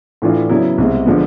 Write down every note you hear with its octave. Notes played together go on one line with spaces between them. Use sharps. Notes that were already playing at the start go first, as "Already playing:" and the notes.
A2 E3 A3 D4 F4
C#3 F#3 B3 E4
C2 B2 G#3
D3 F3 G#3 B3